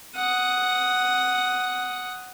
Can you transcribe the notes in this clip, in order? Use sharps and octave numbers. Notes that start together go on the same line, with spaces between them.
F#5 D#6